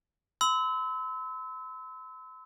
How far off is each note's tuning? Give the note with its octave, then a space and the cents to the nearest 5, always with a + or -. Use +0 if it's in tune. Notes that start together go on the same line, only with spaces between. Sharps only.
C6 -40 E6 -25